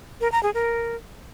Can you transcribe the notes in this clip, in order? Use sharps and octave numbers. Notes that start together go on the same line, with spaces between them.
A#4
A#5
G#4
A#4